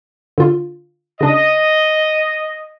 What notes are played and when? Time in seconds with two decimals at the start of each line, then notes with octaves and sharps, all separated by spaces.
0.38 D3 F4
1.21 C#3 D4 D#5